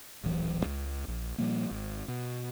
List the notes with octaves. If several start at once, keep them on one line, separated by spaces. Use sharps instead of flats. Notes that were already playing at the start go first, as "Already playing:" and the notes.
D1 A#1 E3 F#3
C#2
A#1
A#2 F3 G3 A#3
G#1
B2